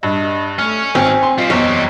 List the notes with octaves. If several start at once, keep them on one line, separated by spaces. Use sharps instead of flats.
G2 D#5
A3 C#4 F6
G#1 C4 G#5
C6
G3 C4 F4 D#5
F#1 E2 C#5 D#5